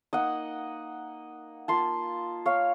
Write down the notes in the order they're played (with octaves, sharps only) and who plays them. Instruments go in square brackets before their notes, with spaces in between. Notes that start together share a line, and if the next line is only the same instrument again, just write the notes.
[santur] A#3 D#4 D#5 F#5
A#3 F4 A5 C6
C#5 F5